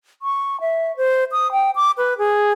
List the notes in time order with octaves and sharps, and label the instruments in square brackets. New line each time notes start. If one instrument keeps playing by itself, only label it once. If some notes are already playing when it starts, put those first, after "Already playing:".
[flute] C#6
E5
C5
D#6
G5
D6
B4
G#4